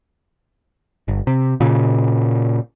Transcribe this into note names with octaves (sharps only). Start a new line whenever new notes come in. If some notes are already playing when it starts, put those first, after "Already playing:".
G1
C3
A#2 C#3